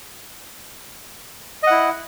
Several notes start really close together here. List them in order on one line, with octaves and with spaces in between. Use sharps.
D#5 F#5 E4